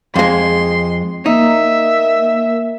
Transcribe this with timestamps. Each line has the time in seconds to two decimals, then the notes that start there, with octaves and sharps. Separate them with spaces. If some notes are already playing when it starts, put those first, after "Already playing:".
0.16 F2 G#3 C6
1.26 A#3 D#4 E5